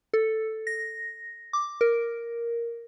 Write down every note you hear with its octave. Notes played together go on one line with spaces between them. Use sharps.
A4
A#6
D6
A#4